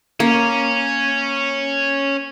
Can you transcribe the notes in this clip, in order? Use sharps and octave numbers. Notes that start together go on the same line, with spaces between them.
A#3 C#4